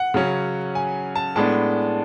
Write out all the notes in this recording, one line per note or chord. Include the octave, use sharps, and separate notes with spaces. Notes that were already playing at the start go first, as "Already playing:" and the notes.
Already playing: F#5
C#3 F#3 C#4
G#5
A5
A2 G#3 B3 D4 A5